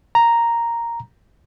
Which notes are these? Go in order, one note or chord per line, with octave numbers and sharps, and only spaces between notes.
A#5